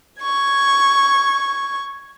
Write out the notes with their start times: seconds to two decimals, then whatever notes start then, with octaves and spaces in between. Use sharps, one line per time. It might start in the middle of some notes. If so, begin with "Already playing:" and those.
0.21 C#6 G#6